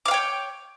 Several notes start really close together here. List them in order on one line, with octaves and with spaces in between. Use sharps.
D6 F5 G5 C#5